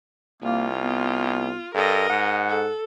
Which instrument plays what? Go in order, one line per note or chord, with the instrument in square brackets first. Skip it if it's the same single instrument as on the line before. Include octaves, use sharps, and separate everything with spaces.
[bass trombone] C2 [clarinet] A#3 [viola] F4
[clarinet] B3
[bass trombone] G2 [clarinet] A4 [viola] A#4 D#5
[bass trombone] G#2 [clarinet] F#5
[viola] A4